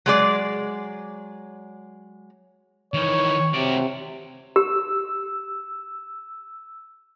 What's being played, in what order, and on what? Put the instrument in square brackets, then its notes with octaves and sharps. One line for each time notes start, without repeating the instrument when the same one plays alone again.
[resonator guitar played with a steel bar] F#3 G#3 D5
[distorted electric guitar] D#3 E3 [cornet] C#5
[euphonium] C3 [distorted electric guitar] F#4 D5
[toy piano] G4 [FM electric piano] E6